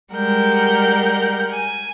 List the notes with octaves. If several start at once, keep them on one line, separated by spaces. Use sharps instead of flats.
G3 G#3 A#4 F#5 G6
G#5